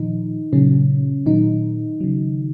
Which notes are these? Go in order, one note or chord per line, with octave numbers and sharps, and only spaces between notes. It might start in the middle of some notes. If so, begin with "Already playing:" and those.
Already playing: A#2 D#3 F3 D#4
A#2 C#3 F#3 C#4
A#2 D#3 F#3 D#4
C#3 F#3